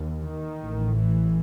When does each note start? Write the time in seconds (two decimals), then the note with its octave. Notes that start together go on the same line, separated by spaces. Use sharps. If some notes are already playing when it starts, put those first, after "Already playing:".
Already playing: D#2
0.22 D#3
0.59 A1 A2
0.98 E3